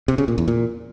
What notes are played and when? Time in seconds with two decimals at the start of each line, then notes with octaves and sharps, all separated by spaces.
0.08 C3
0.18 C#3
0.28 A#2
0.38 E2
0.48 A#2